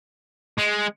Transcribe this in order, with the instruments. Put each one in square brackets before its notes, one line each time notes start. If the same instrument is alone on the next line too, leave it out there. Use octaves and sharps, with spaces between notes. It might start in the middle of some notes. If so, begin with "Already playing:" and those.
[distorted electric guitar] G#3